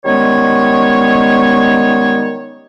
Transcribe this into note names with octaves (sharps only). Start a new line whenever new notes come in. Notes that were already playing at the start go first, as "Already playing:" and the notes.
D#3 G3 G#3 B3 C#4 C#5